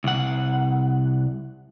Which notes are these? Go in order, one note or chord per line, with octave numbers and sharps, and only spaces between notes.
C2 F#5